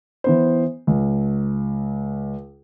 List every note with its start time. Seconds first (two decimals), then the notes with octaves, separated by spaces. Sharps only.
0.24 E3 B3 C5
0.87 C#2